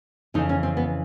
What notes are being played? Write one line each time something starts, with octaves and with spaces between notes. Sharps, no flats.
F2 C#3 E3 D#4
C#4
C4
B3